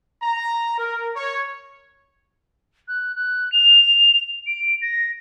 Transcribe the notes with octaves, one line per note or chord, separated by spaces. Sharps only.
A#5
A#4
C#5
F#6
F#6
F7
D7
A#6